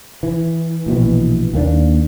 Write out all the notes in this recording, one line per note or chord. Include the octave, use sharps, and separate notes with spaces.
E3
A#1 B2 D#3 E3
D#2 A#3 B3 D4